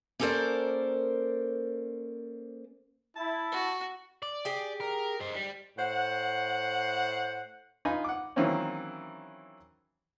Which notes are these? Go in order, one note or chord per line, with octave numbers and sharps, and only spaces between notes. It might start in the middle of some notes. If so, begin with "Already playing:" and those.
A#3 C#4 A4 A#4 C5 D5
E4 A5
F#4
D5
G4 G#4
A#4
C5 D#5
G3
A2 C5 F#5
D#4 F4 B4 G#5
F#5 D6
D#3 E3 F#3 A#3 C4 C#4